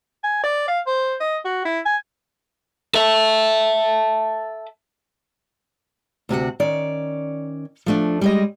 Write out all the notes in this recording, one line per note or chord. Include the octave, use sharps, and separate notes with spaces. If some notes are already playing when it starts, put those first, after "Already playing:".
G#5
D5
F5
C5
D#5
F#4
E4
G#5
A4 E5
D2 C3 F#4 F#5
D#3 C#4 D5
F3 A3 D4
G3 G#3 D#5